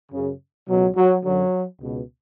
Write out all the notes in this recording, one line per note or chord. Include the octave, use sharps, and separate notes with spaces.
F#2 C#3
C#2 B2 F#3
F#3
F#2 D3 F#3
C#2 B2